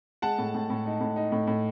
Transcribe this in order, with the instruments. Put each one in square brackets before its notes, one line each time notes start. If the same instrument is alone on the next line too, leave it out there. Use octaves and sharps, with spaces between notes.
[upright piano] G#3 F#5 A5
A2
A2
A2
D#4
A2
D#4
A2
A2